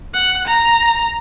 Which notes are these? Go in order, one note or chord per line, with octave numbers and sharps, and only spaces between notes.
F#5
A#5